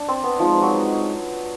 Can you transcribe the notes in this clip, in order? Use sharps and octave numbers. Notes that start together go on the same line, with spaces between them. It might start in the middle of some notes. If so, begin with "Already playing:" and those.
Already playing: D4
C4
B3
F3 G#3 C4 D#4
F#3